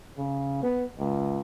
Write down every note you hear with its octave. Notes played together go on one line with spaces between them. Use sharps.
C#3
B3
C#2